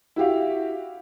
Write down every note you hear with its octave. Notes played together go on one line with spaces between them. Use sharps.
E4 F#4 G4 F5